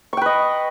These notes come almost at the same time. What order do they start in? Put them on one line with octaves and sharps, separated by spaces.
C#6 G5 B4 D#5